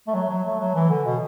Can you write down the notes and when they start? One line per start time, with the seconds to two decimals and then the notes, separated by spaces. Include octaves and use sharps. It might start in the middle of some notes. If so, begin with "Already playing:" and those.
0.07 A3
0.14 F#3
0.29 F#3
0.45 A3
0.60 F#3
0.75 E3
0.90 D3
1.06 B2